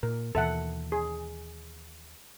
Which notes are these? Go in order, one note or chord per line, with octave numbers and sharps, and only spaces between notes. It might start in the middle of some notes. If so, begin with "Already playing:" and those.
A#2 A#4
D#2 B2 E3 A4 E5 F#5
G#4